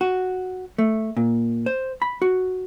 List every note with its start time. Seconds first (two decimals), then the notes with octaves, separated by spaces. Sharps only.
0.01 F#4
0.78 A3
1.17 A#2
1.66 C5
2.02 B5
2.22 F#4